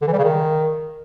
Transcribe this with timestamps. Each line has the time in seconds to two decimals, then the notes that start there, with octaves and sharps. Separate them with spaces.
0.02 D3
0.07 E3
0.13 G3
0.18 C#3
0.24 D#3